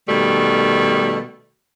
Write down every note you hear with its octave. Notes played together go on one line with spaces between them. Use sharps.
B2 D#3 G3 A3